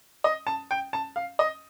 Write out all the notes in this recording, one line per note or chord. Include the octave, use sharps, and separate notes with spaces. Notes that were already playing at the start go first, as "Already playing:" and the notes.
D#5
A5
G5
A5
F5
D#5